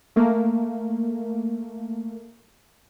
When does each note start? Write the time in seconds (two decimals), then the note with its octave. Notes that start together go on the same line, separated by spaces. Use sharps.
0.16 A3 A#3